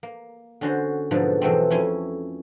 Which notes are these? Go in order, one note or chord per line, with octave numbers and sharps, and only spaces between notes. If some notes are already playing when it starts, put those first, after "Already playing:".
A#3
D3 C#4 F#4 C5
G#2 B2 D3 F3 F#3
E2 B2 F3 F#3 A3 C4
F2 A3 C#4 E4 G#5 C6